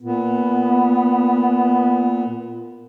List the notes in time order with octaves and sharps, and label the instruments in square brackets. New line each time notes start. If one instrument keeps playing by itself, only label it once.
[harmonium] A#2 [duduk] B3